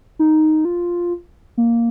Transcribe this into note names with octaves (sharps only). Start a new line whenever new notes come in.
D#4
F4
A#3